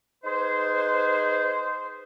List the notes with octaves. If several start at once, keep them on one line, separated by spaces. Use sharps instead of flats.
D#4 G#4 B4 C5